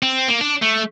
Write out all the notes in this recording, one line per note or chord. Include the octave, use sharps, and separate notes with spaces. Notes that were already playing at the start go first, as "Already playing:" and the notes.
C4
A#3
D4
A3